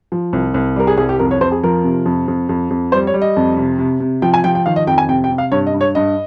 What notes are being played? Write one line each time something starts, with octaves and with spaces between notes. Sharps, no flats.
F3
C2
C2
G3 A#4
G#4
C2 G#4
G4
F2 A#4
C#5
F2 C5
G#4
F3 A#4
C3
F2
F2
F2
F2
G3 C5
C#5
G3
D#5
F2
C3
C3
C3
F3 G5
G#5
F3 G5
G5
D#3 F5
D#5
F2 G5
G#5
C3 G5
G5
C3
F5
G2 C#5
D#5
G2
C#5
G2 D#5